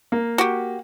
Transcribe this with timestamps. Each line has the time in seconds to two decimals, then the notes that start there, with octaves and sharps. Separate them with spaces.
0.12 A#3
0.38 F#4 G4